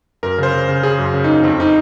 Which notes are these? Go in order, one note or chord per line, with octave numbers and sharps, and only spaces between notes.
F#2 A#4
C#3 C5
C#3
C#3
C#3 G#4
F#2
C#3
F#2 D#4
F2 C4
D#4